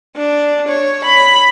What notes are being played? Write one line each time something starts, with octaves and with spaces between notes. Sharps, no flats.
D4
C#5
B5